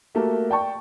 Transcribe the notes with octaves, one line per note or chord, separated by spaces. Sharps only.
A3 A#3 F#4 G4 A4 A#4
D5 G5 A5 C#6